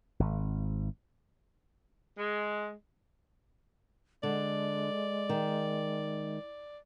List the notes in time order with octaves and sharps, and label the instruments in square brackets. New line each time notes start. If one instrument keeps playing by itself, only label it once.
[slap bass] G#1
[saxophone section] G#3
[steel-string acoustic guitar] D3 [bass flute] G#3 [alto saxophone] D5
[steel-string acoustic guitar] D#3